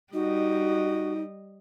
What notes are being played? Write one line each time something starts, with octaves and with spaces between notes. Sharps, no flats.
G3 D#4 F#4 D#5